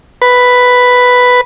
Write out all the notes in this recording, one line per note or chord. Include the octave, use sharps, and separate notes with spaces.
B4